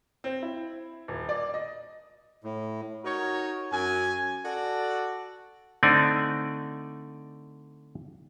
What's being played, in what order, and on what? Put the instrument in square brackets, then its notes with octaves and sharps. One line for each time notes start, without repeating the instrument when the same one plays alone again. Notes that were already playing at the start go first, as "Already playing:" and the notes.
[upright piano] C4
E4
D#1
D5
D#5
[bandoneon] A2
[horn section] D#4 F#4 A#4 C#5
F#2 G#5
F#4 A4 D5
[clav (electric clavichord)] D3 A3 C4 D#4 D5 G#5